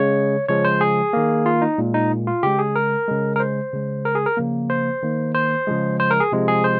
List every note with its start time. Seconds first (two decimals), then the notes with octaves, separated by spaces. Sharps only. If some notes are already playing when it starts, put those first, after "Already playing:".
Already playing: C#3 G#3 C#5
0.49 C#3 F3 G#3 C#5
0.65 C5
0.81 G#4
1.13 D#3 A#3
1.46 F4
1.62 D#4
1.78 A#2 G#3
1.94 D#4
2.27 F4
2.43 C#3 G#3 G4
2.59 G#4
2.76 A#4
3.08 C#3 G#3
3.36 A#4
3.40 C5
3.73 C#3 G#3
4.05 A#4
4.15 G#4
4.26 A#4
4.37 C#3 F3 A#3
4.70 C5
5.03 D#3 A#3
5.35 C5
5.67 C#3 F3 G#3
6.00 C5
6.11 A#4
6.20 G#4
6.32 C3 F3 G#3
6.48 G#4
6.64 C5